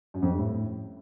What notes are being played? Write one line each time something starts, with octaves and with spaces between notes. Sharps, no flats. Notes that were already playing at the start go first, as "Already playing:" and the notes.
F#2
F2
G2
A2